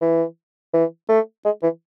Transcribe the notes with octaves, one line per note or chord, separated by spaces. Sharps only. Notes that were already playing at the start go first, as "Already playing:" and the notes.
E3
E3
A3
G#3
E3